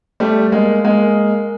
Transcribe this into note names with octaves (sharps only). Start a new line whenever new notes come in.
G3 A3
G#3 A#3
G#3 A#3